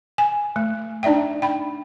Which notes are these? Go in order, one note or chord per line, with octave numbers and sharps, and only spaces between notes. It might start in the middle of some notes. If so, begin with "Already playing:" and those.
G#5
A3
D4 D#4 D5 E5 G5
G5 B5